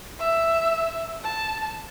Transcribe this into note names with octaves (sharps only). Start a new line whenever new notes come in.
E5
A5